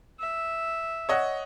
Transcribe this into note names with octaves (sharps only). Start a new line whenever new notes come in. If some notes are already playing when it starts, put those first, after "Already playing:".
E5
C#5 D#5 F#5